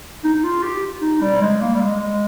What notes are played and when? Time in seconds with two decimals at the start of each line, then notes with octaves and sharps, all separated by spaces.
0.24 D#4
0.34 D#4
0.44 F4
0.63 G4
1.02 D#4
1.22 G3
1.42 G#3
1.61 A#3
1.75 G3
1.81 G#3